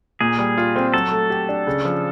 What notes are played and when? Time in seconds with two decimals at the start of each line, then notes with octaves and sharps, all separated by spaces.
0.21 A#2 G#4
0.38 G3
0.58 F4
0.76 C4
0.94 F#3 A4
1.12 A3
1.30 G4
1.49 D4
1.67 C#3
1.85 F3